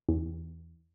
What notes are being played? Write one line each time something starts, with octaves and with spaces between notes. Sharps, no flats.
E2